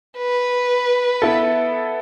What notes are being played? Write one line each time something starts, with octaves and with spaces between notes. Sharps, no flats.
B4
B3 E4 A4